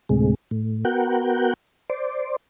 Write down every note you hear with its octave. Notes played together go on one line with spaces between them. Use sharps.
D2 A2 C3 G#3
A2
B3 F#4 A#4 F#5 G5
C5 D5